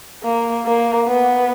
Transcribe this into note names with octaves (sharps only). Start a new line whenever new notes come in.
A#3
A#3
B3